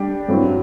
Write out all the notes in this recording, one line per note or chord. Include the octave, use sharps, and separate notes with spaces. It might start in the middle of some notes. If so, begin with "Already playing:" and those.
Already playing: G3 D4 G4
G2 F#3 C4 E4